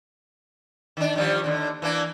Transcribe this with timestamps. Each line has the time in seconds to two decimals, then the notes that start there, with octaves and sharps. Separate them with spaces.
0.97 D#3 D4
1.16 D#3 F3 G3
1.44 D#2 D3
1.82 E3 A#3 D4